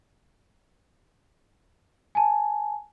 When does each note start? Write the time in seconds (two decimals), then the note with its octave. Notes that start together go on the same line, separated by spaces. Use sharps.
2.15 G#5 A5